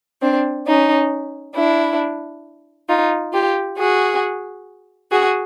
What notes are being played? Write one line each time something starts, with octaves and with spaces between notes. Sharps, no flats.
C4 D4
C#4 D#4
D4 E4
D#4 F4
F4 G4
F#4 G#4
F#4 G#4